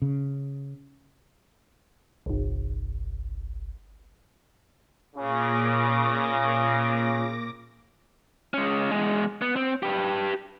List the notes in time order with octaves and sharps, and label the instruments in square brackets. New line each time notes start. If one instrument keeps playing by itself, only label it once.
[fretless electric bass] C#3
[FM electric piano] G1 C2
[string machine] A#2 D6 A#6 [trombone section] C#3
[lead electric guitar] G#3 C#4
E2 G#3
B3
C4
G4 B4